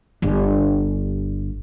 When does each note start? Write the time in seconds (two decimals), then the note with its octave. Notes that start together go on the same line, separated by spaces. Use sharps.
0.22 G1 D4